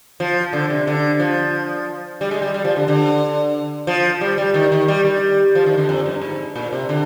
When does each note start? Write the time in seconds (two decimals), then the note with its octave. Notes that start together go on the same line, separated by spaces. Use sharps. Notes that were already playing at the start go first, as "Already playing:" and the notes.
0.20 F3
0.53 D3
0.70 C3
0.87 D3
1.20 F3
2.21 G3
2.31 G#3
2.42 G3
2.54 G3
2.65 F3
2.76 D3
2.88 D3
3.87 F3
4.21 G3
4.38 G3
4.54 D#3
4.72 D#3
4.88 G3
5.05 G3
5.55 F3
5.66 D#3
5.77 D3
5.89 F2
6.06 G2
6.22 G#2
6.56 A#2
6.73 C3
6.89 D3